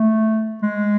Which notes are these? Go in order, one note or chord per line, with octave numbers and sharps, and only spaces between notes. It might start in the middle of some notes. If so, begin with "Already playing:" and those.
Already playing: A3
G#3